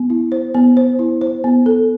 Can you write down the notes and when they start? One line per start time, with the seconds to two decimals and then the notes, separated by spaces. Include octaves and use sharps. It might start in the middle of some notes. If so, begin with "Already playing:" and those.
Already playing: B3
0.10 E4
0.32 C5
0.54 B3
0.77 C5
0.99 E4
1.21 C5
1.44 B3
1.66 A4